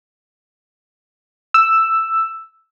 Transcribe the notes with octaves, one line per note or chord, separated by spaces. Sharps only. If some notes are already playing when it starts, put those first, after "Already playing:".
E6